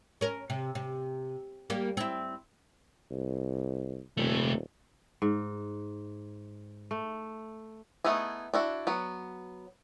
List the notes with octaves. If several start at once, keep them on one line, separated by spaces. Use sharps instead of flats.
C#4 A#4
C3
C3
G3 A#3 G4
C4 E4
C2
D#1 C3 A3
G#2
A3
A3 B3 D#4 E4 G#4
D4 E4 F#4
F#3 B3